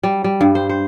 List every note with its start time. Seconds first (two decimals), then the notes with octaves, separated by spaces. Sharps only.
0.03 G3
0.24 G3
0.41 G2
0.55 C5
0.69 C5